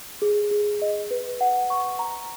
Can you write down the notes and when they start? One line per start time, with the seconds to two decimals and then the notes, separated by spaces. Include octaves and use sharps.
0.22 G#4
0.51 G#4
0.82 D#5
1.11 B4
1.41 F#5
1.70 C#6
1.99 A#5